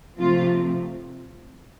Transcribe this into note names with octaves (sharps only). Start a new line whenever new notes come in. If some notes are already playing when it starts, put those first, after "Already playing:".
C3 F3 A3 C4 F4